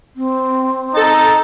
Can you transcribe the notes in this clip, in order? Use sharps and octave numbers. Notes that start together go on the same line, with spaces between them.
C4
D#4 A4 A6